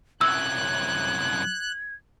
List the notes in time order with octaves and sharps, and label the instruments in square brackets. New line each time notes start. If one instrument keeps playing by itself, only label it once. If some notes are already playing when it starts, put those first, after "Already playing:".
[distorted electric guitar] C2 F#2 [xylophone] E6 [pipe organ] F#6 [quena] G#6